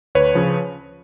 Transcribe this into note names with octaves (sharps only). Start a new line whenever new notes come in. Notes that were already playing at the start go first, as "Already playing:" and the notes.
D2 B4 C#5
C#3 F3